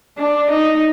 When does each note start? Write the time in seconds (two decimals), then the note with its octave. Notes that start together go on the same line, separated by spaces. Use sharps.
0.18 D4
0.50 D#4